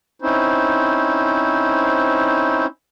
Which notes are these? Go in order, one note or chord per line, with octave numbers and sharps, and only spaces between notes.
C4 C#4 D#4 E4 C5